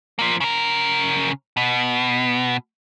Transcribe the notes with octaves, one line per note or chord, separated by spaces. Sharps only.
F3 A#3
C#3 A#4
B2